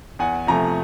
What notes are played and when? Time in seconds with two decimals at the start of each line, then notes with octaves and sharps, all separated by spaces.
0.19 E2 F#5 G#5
0.47 C3 F3 A3 G#5 A#5